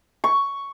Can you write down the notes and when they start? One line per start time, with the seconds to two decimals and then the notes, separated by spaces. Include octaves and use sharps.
0.24 C#6